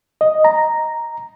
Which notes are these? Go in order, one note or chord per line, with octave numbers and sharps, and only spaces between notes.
D#5
A#5